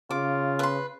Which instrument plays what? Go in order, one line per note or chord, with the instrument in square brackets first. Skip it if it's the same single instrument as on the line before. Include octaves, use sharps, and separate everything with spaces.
[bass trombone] C#3 [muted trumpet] F4 [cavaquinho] D6
[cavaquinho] B4 C6